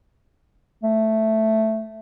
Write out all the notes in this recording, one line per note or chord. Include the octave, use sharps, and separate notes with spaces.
A3